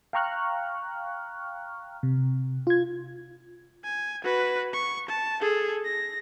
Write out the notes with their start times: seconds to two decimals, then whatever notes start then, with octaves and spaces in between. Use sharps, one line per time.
0.13 F5 G5 A#5 C#6 F6 F#6
2.03 C3
2.67 F4 G#6
3.84 G#5
4.24 F#4 B4
4.74 C#6
5.09 A5
5.41 G#4 A4
5.85 A#6